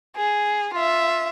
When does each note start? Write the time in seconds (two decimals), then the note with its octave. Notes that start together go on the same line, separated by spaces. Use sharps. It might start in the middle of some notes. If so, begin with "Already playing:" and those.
0.16 G#4
0.74 F4 E5